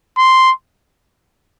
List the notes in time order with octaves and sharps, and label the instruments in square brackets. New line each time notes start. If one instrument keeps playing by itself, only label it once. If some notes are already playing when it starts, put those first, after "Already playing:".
[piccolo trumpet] C6